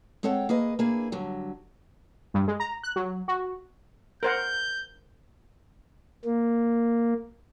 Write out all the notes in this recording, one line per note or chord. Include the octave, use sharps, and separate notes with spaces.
G#3 C4 A4 C#5 F#5 G5
A#3 G#4 B4 D#5
A#3 D4 E4 G#4 B4
G2 D3 F#3
G2
G#3
A#5
F#6
F#3
F#4
A#4 C5 F#5 G6
A#3